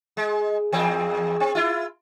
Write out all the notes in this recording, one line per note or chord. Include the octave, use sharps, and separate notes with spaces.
G#3
E2 C4 G#4
C4
E4 F4